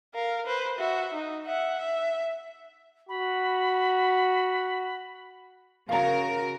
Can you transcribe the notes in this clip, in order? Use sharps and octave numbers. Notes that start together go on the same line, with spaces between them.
A#4 F5
B4 C5
F#4 E5
D#4
E5 F#5
E5
F#4 B5
C#3 F#4 A#4 F5 A#5